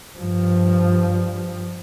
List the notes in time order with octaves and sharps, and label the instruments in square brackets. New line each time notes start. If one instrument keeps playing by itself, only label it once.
[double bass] G2 F3